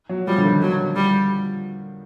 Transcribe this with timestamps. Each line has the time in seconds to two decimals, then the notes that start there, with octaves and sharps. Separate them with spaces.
0.09 F#3
0.27 F3 G3
0.38 D3
0.45 D#3
0.62 D3 F#3
0.96 G3